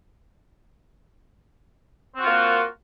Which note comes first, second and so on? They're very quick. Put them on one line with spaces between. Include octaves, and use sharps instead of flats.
C4 F#4 F4 A#3